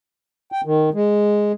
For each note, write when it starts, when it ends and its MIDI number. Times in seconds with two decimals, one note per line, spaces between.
0.52 0.61 79
0.65 0.89 51
0.94 1.52 56